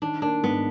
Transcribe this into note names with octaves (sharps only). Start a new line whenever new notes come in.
D#3 D4
A#3 D4
G#2 B3